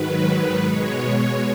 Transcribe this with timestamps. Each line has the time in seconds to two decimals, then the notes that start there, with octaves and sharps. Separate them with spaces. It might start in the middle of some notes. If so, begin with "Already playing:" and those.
Already playing: G#2 D#3 F#3 B4
0.56 B2 G#3 C#5